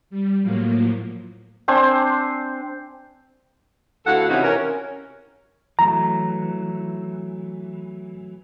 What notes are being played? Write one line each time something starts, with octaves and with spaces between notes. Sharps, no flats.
G3
A2 F3 F#3 A#3
C4 D4 C5 G#5
D2 E4 F#4 A4 F5 F#5
C3 E3 C#4 D#4 E4 F#4
C#4 A#4
E3 F#3 A3 A#5